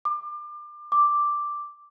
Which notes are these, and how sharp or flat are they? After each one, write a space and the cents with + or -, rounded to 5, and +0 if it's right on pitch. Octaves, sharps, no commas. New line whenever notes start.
D6 +30
D6 +0